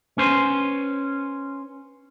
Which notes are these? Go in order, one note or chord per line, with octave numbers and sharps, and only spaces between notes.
C#4 B4 C5